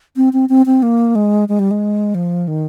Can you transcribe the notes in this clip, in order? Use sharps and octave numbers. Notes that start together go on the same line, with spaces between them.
C4
C4
C4
C4
A#3
G#3
G#3
G3
G#3
F3
D#3